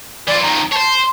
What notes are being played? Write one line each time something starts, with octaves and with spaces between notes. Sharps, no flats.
E3 F4 D5
F2 D#3 A#5
C5 C#5 A5
C6